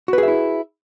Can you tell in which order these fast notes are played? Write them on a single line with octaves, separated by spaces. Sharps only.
F#4 B4 G#4 E5 E4